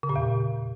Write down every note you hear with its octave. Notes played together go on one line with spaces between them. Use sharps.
C#3
A#2
E2